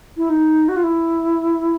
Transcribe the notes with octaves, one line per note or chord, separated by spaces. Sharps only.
E4
D#4
F#4
F4
E4